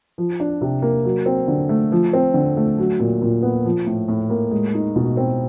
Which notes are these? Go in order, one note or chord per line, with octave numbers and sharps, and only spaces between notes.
F3
D4
C3
A#3
F#3
C4
D3
A3
F3
C4
D3
A3
F#3
A#2
A#2
B3
F3
A2
A2
A#3
G#3
D#4
B2
C4